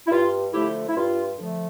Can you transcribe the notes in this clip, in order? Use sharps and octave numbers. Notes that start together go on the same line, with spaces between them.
E4
G2 F4
D3 F3 A3 E4 G4
E4
G2 F4
D3 F3 A3